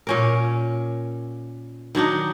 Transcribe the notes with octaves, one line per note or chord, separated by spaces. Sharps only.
A#2 C#4 A#4
D#3 F#3 D4 D#4